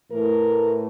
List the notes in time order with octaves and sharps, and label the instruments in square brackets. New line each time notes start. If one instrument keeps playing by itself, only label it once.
[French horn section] A2 E3 A3 A#4